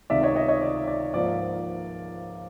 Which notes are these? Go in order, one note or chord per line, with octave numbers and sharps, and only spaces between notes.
C#2 C3 D#3 D5 E5
C#5 D#5
C#5 D#5
C#5 D#5
D5
D5
G#2 F3 A#3 D5